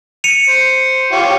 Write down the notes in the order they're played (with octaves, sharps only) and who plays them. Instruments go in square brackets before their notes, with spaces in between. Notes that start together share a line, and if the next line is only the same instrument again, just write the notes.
[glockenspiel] C#7 D#7 F7
[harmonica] C5
F4 G4 C#5